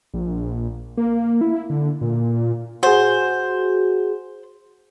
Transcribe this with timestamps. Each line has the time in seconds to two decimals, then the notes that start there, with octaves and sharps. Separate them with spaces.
0.14 A#1
0.97 A#3
1.41 E4
1.70 D3
2.01 A#2
2.83 F#4 G#4 C5